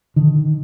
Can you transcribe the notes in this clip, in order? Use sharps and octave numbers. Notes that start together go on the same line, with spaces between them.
D3 D#3